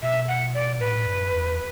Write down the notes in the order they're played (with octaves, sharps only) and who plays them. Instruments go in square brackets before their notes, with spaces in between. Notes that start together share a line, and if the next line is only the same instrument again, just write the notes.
[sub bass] B2 [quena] E5
[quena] F#5
D5
[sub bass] A2 [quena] B4
[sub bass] F#2
E2